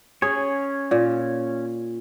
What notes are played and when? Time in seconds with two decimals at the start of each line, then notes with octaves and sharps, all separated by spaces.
0.22 C#4 G#4 C#5
0.91 A#2